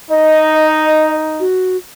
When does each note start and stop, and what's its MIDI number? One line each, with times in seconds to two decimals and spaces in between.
0.10 1.43 63
0.10 1.14 75
1.40 1.77 66